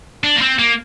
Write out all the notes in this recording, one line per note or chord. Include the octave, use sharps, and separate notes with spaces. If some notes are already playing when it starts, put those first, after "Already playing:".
D4
A#3
C4
A#3